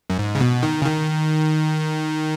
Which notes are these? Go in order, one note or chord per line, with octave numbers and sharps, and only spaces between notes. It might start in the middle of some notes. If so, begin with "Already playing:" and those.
F#2
G#2
C#3
B2
D#3
C#3
D#3